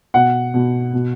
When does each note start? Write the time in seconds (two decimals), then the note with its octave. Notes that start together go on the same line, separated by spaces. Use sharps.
0.14 B2 F#5
0.54 B2
0.93 B2